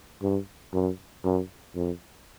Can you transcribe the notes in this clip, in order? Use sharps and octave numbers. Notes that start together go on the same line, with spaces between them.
G2
F#2
F#2
F2